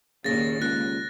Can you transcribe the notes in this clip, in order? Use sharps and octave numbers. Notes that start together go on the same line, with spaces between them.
D#2 A#2 C#3 A6 A#6
C#2 F#6 A#6